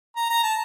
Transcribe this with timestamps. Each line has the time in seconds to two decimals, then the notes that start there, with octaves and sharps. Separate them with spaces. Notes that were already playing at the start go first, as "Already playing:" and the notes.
0.16 A#5
0.29 A#5
0.43 A5